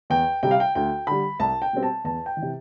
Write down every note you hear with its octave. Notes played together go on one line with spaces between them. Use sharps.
E2 G5
C3 G3 G5
F5
G5
D2 G5
D3 G3 B5
C2 A5
G5
B2 G3 C4
A5
E2 A5
G5
E3
C3